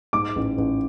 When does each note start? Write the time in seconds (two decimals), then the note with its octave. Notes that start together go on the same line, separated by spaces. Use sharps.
0.13 G#2 D6
0.36 A1
0.58 A1